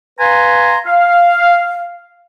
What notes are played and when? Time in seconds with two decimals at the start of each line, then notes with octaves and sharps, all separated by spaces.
0.19 B4 F5 G#5 A#5 C6
0.85 F5